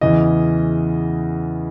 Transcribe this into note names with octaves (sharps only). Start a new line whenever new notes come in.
E2 C#3 E3 D#5